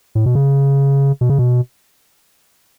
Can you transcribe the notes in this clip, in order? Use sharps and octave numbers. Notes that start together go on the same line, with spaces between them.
A2
B2
C#3
B2
C#3
B2